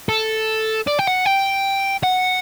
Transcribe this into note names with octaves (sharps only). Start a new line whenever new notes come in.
A4
D5
G5
F#5
G5
F#5